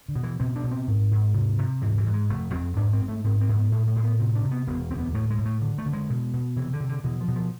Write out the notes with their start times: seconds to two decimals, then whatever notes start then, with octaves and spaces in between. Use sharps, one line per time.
0.09 D3
0.15 B2
0.23 E3
0.40 B2 C4
0.56 D4
0.64 B2
0.71 C4
0.88 G#2
1.11 G#2
1.34 C3
1.58 C3
1.82 G#2 E3
1.98 E3
2.06 G#2
2.13 G#3
2.29 F1 A3
2.53 F2 C4
2.77 G#2 D4
2.93 C4
3.01 G#2
3.08 A3
3.24 G#2 C4
3.41 C4
3.49 G#2
3.57 B3
3.72 A2 A3
3.88 A3
3.96 A2
4.03 B3
4.19 C3 C4
4.35 D4
4.43 C3
4.51 B3
4.67 E1 B3
4.90 D2 C4
4.99 B3
5.14 A2 A3
5.30 G#3
5.38 A2
5.46 A3
5.62 D3
5.78 A3
5.86 D3
5.93 G#3
6.10 B2
6.33 B2
6.56 C3 E3
6.73 D3
6.80 C3
6.89 D3
7.04 B2 E3
7.20 F3
7.28 B2
7.36 F3